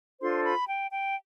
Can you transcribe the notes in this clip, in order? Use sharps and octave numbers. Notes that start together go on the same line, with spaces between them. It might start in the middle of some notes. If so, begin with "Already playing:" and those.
D4 F4 A4 C5 C6
B5
G5
G5